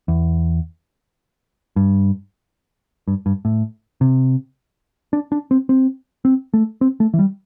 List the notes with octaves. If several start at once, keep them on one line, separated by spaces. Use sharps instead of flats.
E2
G2
G2
G2
A2
C3
D4
D4
C4
C4
C4
A3
C4
A3
E3
G3